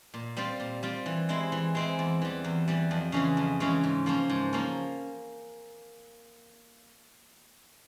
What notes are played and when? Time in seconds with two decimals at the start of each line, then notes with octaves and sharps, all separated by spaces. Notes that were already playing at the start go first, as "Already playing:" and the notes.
0.14 A#2
0.37 G3 C4 F4
0.60 A#2
0.83 G3 C4 F4
1.06 E3
1.29 G#3 C4 E4
1.52 E3
1.75 G#3 C4 E4
1.99 E2
2.22 E3 G3
2.44 E2
2.68 E3 G3
2.91 F2
3.12 C#3 E3 G#3 C#4
3.37 F2
3.60 C#3 E3 G#3 C#4
3.84 G#2
4.06 F3 A#3 C#4
4.29 G#2
4.53 F3 A#3 C#4